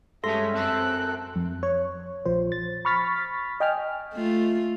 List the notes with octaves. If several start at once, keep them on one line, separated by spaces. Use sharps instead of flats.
G2 G#3 A3 C#4 A4 E5 C6 A#6
F#2 C4 A4 E5 E6 F#6
F2
C#5
A#1 F3 C5
A6
B5 C#6 F6 A6 B6
D#5 G5 G#5 F6
A3 F4